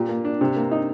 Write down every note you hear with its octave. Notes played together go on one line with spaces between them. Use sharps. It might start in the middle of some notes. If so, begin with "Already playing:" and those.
Already playing: A#2 G4
A#3
D4
C3
A#3
D#4